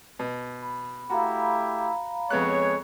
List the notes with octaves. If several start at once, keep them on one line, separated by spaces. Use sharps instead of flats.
B2
B5
A3 E4 F#4 G4 F5 A#5 B5
F2 G#3 B3 C#5 F#6